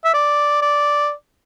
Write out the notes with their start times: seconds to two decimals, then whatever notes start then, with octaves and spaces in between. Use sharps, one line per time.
0.05 E5
0.14 D5
0.62 D5